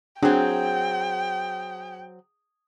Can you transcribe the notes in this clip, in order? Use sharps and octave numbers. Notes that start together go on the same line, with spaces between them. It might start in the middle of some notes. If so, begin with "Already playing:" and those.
F#3 C4 D4 G#4 G5